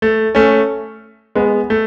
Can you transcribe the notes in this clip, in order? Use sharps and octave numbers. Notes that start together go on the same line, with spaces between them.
A3
A3 C#4
G#3 B3
A3